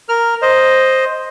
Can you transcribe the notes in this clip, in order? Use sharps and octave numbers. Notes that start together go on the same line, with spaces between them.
A#4 F6
C5 D#5